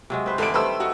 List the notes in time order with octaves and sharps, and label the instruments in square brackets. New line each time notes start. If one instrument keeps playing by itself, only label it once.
[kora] C3 F#3 G#3
C4 B4 C5
[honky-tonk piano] F1 D7 [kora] D3 E3 D5
[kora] D#3 G3 A3 [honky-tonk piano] B4 C5 E6
[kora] D#4 [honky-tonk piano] F#4